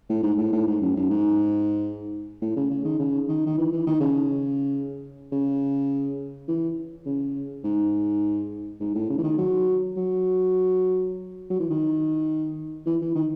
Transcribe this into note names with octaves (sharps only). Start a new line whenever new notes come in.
A2
G#2
A2
A2
G#2
F#2
F#2
G#2
A2
C#3
C#3
D#3
C#3
D#3
D#3
E3
E3
D#3
C#3
C#3
E3
C#3
G#2
G#2
A2
C#3
E3
D#3
F#3
F#3
F#3
E3
D#3
E3
E3
D#3